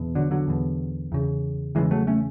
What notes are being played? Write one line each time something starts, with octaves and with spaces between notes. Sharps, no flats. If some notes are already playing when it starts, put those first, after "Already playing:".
Already playing: E2 B2
D3 F#3
D3 F#3
E2 B2
E2 C#3
E2 C#3 E3 G#3
F#3 A3
A3 C#4